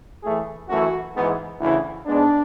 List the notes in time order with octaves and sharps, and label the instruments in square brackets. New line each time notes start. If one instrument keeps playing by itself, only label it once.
[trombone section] A2 E3 A3 G#4
F#2 E3 A3 F#4
G#2 E3 G#3 B3
D2 C#3 E3 E4
G#2 G#3 B3 D4